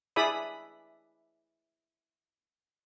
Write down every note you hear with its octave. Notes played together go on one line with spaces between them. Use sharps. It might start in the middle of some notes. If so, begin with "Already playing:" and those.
E4 G#4 D5 E5 B5 D#6